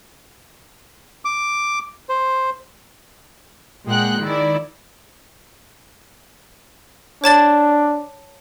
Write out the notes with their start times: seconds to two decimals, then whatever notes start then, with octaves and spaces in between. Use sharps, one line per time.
1.25 D6
2.09 C5
3.86 A#2 G#3 A#4 F#5 G5 F#6
4.21 D#3 E4 D5
7.24 D4 C#5 A5 A6